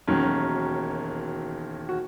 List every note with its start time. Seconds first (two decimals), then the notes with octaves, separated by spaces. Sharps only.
0.08 E1 D#2 D#3 F#3 C#4
1.89 F#4